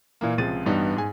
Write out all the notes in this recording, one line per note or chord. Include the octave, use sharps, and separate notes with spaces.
A#2 E3 A#3
C#2 C3 F3 G#3 A6 D#7
A1 G2 G3 B3 D#4
G#2 G#5